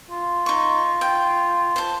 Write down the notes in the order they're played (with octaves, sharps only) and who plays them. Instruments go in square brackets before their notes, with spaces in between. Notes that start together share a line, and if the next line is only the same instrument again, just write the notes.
[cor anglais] F4
[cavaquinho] D#4 C#6
G5
C5 A5